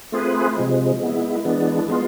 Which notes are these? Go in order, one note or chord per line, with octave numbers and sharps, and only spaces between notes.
A3 C4 F4 G#4 B4
C3 F3 G#3
G#3 B3 E4
E3 G#3 B3 D4
G#3 B3 F4